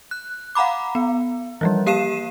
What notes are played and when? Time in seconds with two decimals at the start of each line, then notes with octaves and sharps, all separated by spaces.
0.11 F#6
0.55 F5 F#5 A#5 B5 D6
0.95 B3
1.61 E3 F3 G3
1.86 A#3 G4 F5 C7 D#7 E7